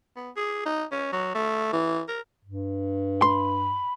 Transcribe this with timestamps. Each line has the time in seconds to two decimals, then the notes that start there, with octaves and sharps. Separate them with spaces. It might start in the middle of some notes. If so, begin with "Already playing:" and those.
0.16 B3
0.37 G#4
0.66 D#4
0.92 C#4
1.13 F#3
1.35 A3
1.73 E3
2.08 A#4
2.45 G2
3.22 B5 C6